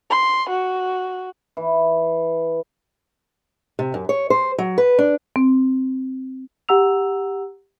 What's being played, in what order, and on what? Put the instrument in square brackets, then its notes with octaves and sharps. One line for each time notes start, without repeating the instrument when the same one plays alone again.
[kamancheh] C6
F#4
[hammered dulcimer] E3
[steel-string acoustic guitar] C3
F#2
C#5
C5
F#3
B4
D4
[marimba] C4
[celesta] G4 F#5 A#5 E6 F7